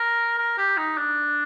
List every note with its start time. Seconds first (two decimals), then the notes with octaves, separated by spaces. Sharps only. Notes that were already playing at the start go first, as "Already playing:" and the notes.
Already playing: A#4
0.38 A#4
0.58 G4
0.77 D#4
0.97 D4